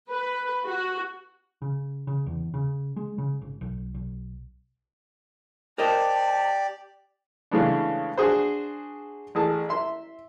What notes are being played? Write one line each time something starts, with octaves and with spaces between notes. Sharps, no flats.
B4
F#4
C#3
C#3
E2
C#3
G#3
C#3
G#1
B1
B1
G4 A#4 C5 D5 D#5 A5
C#3 E3 G#3 A3 B3 D4
D4 F#4 G#4 C5
A1 G#4 A5
E5 C6